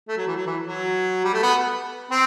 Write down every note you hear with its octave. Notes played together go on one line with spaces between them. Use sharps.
A3
F#3
E3
F#3
E3
F#3
G3
A3
B3
C4